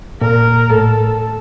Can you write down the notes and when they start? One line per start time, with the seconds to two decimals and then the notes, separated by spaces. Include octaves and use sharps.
0.21 A#2 A#4
0.70 A2 A4